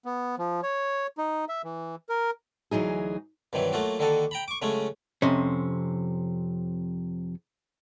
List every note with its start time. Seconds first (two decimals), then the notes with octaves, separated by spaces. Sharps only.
0.05 B3
0.39 F3
0.63 C#5
1.18 D#4
1.49 E5
1.64 E3
2.09 A#4
2.71 D2 E3 F#3 D#4 G#4
3.53 G2 C3 D#3 E3 F#3
3.73 F#3 A3 A#3 F4 F#4
3.99 D3 D#3 A#3 F#4 A4
4.31 G5 A#5 B5
4.48 C#6 D6
4.62 C#3 F#3 G#3 A3 C#4
5.22 F2 C3 C#4